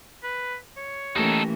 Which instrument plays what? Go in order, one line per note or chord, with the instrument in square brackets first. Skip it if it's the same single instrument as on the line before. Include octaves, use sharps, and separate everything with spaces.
[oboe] B4
C#5
[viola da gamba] E3 A#3 C#4 [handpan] A3 G4 [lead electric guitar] D#4 A4